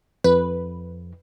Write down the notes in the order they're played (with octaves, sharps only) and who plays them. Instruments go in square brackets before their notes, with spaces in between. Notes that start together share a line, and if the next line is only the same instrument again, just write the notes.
[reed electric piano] F2 [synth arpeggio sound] B4